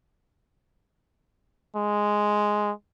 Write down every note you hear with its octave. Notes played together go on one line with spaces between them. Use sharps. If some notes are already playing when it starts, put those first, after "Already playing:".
G#3